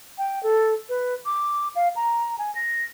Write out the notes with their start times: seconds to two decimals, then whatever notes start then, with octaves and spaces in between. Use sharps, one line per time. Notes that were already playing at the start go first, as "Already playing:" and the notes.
0.18 G5
0.43 A4
0.89 B4
1.26 D6
1.76 F5
1.96 A#5
2.39 G#5
2.55 A#6